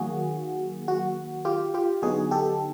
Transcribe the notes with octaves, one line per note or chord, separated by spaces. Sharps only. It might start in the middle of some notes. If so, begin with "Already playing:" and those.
Already playing: D#3 F#3 A#3 F#4 G#4
F#4
F4 G4
F4 G4
D3 F#3 B3 D#4 F#4 G#4
G4 A4